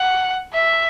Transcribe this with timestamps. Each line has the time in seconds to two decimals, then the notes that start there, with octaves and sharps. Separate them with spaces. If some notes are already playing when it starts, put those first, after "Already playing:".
Already playing: F#5
0.53 E5